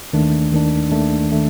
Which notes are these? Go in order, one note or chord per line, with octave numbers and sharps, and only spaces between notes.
D#2 D#3 A3 D4
D#2 D#3 A3 D4
D#2 D#3 A3 D4
D#3 A3 D4